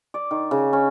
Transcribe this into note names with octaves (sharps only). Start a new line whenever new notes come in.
D5
D#3
C#3
C#4